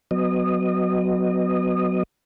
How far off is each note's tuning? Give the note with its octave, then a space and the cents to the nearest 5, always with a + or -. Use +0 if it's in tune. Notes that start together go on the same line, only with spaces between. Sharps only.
F#3 +0 B3 +25 D#5 -20